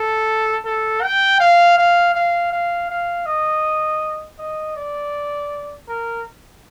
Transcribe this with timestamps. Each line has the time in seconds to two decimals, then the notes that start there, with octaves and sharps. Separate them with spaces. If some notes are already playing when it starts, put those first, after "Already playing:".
Already playing: A4
0.65 A4
1.02 G5
1.40 F5
1.78 F5
2.15 F5
2.52 F5
2.90 F5
3.26 D#5
4.39 D#5
4.77 D5
5.89 A#4